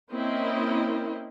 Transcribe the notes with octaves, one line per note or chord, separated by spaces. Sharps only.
A#3 C4 C#4 E4 A#4 D#5